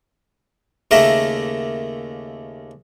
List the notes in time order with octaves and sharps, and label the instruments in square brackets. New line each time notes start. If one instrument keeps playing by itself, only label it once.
[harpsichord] D#2 C#3 A3 A#3 A#4 E5